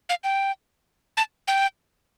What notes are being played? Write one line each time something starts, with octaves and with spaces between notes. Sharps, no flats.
F5
G5
A5
G5